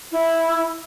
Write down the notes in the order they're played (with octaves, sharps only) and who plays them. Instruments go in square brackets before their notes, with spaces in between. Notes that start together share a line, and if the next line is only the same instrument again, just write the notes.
[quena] E4